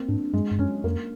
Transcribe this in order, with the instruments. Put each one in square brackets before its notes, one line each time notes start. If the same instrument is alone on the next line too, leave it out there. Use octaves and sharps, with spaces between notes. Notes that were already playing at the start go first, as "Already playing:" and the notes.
Already playing: [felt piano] A#3 C4
[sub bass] G#2 [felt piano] D4
[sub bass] G2 [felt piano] G#3
[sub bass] G2
[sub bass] F#2 [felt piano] C#4
[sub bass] F2 [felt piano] A#3